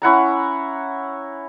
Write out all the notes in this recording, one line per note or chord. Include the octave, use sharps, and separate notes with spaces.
C#4 E4 F#5 A#5